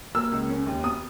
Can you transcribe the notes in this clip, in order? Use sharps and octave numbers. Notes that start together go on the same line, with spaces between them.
A#3 E6
C#2
C#4
D#2
B3 D#6